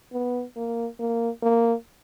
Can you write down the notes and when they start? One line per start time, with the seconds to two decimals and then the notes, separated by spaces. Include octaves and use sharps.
0.13 B3
0.56 A#3
0.99 A#3
1.43 A#3